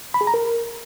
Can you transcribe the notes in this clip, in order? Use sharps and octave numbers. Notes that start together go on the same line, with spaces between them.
B5
G#4
A#5
A#4